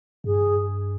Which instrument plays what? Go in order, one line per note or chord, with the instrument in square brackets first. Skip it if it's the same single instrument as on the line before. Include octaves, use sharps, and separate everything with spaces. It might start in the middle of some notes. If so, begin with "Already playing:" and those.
[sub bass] G2 [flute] G#4